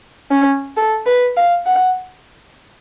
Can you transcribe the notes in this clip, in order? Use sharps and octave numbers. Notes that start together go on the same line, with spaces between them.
C#4
A4
B4
F5
F#5